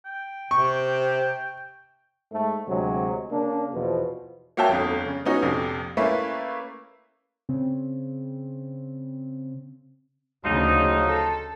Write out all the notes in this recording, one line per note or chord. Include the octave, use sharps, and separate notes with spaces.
G5
C3 C#6
G#2 A3
D2 C3 F#3 G#3
C#3 A#3 D4
E2 B2 F3
A#3 F#4 C#5 E5 G5 A5
G1 F2
C#3
B3 C#4 D#4 F#4
A#1 F2 C3
A3 A#3 C#4 E4 B4
C#3 C4
D2 C#3 F3 F#3 D#4
A4